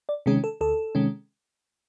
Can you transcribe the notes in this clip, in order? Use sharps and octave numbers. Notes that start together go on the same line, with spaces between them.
D5
C3 D#3 G#3 C#4 G#4
A4
D2 A4
C3 D#3 G#3 C#4